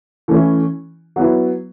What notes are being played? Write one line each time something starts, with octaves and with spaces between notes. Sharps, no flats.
E3 A3 C#4 E4
F#3 B3 E4